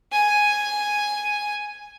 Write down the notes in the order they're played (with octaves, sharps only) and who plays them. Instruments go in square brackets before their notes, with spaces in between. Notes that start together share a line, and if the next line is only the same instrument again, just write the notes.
[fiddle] G#5